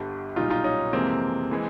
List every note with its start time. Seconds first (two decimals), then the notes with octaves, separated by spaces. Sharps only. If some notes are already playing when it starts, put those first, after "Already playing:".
Already playing: G1 G2 D3 G3
0.36 B1 A#2 G3 D#4 F4
0.50 D#4 F4
0.64 C#4 D#4
0.93 F2 C3 E3 G#3 A#3 C4
1.51 E3 G#3